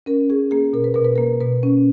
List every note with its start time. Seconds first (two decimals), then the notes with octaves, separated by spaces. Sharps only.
0.06 C#4 A#4
0.30 C#4 G#4
0.51 A#3 G#4
0.73 B2 A#4
0.84 B4
0.94 B2 A#4
1.05 B4
1.16 A#3 A#4
1.41 B2 B4
1.63 C#4